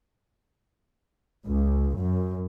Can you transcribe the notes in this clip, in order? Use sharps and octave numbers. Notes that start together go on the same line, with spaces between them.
C#2
F#2